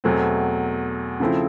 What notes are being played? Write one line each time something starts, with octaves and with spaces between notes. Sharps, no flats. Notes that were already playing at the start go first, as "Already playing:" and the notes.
E2 B2 F#3 A3 C4
C#3 F3 A3 C4 E4